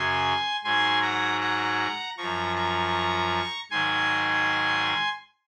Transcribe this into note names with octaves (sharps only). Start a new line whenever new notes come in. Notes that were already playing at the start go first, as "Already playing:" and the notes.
Already playing: F#2 C#3 F#3 G#5 C6
G#2 F#3 G#5 C6
F#5 A#5
F#5 A#5
F#2 F3 A#5 C#6
A#5 C#6
G#2 D#3 F#3 G#5 C6